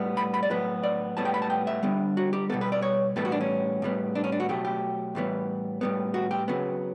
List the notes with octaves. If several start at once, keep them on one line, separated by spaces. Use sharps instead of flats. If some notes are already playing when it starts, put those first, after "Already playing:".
Already playing: A2 G3 B3
B5
B5
D5
A2 F#3 B3 B4
D5
A2 G3 B3 A5
G5
B5
A5
G5
E5
D3 G3 B3
F#4
G4
B2 G3 B3 A4
B4
D5
C#5
A2 E3 G3 B3 A4
F#4
D4
C#4
A2 G3 B3
D4
C#4
D4
F#4
B2 F#3 A3 G4
G4
A2 E3 G3 B3
A2 G3 B3
F#4
G4
C#3 F#3 B3